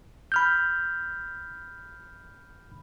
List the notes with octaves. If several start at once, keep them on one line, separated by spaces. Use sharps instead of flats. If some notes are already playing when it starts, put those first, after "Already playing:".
B5 F6 G6